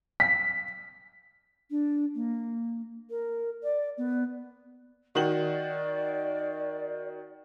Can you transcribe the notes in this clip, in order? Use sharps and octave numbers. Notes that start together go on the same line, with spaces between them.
B6
D4
A#3
A#4
D5
B3
D#3 F#4 D5 F#7